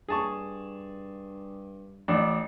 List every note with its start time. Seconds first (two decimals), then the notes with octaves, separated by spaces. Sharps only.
0.09 G2 G#4 A5 C#6
2.08 A1 D4